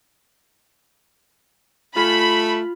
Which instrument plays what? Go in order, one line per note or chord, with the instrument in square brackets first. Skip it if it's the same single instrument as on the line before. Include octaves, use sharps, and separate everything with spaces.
[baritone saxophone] A3 [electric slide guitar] F4 G#5 [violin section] B5